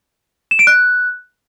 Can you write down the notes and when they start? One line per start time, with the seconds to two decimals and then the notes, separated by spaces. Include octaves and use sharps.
0.51 E7
0.59 D7
0.67 F#6